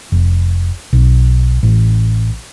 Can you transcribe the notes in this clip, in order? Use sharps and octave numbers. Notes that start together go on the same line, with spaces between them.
F1
B1
A1